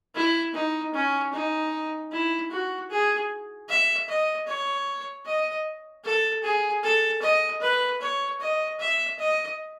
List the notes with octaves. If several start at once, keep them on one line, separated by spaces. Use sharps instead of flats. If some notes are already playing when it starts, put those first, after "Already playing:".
E4
D#4
C#4
D#4
E4
F#4
G#4
E5
D#5
C#5
D#5
A4
G#4
A4
D#5
B4
C#5
D#5
E5
D#5